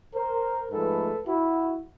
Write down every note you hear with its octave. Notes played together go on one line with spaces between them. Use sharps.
A#4 C5
G#2 F3 A3 A4 B4
E4 F#4